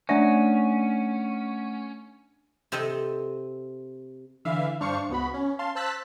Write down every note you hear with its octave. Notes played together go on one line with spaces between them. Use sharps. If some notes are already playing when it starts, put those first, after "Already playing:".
A3 C#4 D4 D5 E5 F#5
C3 C4 A4 D#5
D3 E3 E5 F5
G2 D4 C5 F5 C#6 C#7
C#2 B3 F#4 B5
C#4
F5 A5 C6
C5 A5 E6 F#6 A6 B6